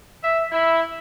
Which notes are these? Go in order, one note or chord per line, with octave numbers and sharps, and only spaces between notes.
E5
E4